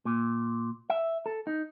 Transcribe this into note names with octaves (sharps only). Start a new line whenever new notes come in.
A#2
E5
A4
D#4